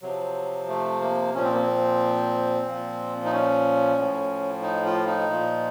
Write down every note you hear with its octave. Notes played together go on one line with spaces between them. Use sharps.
C3 F3 F#3
A3
A#3
A#2 F3 C#4
C4
A#3
C4
A#2 F3
D#4
C#4
A2 F3
D#4
F4
D#4
A#2 F3